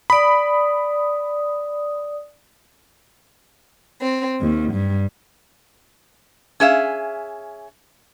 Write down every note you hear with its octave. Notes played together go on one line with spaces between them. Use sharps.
D5 B5 D#6
C4
D#2
G2
C#4 G#4 E5 F5